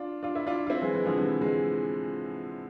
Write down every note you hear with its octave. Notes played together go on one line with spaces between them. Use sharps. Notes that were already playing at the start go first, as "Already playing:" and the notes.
Already playing: D4 F4
D4 F4
E4
D4 F4
F4
C4 E4
E3 G#3
E3 G#3
D3 F3
C3 E3
E3 G#3